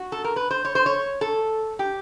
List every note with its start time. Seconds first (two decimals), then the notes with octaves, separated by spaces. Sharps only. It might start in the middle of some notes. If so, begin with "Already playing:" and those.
Already playing: F#4
0.12 A4
0.24 A#4
0.36 B4
0.51 C5
0.65 C#5
0.75 C5
0.86 C#5
1.21 A4
1.79 G4